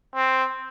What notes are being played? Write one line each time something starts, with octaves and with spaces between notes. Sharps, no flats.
C4